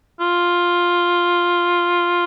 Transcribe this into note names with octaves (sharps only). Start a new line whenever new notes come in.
F4